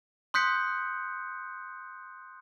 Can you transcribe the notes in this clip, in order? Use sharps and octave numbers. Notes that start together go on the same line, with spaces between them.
C6 D#6 F#6 G6 B6 C#7